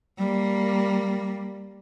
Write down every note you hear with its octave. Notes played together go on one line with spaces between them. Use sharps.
G3 A#3